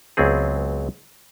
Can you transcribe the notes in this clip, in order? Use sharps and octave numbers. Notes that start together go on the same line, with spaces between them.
C#2 F#3 B3 C4 G#4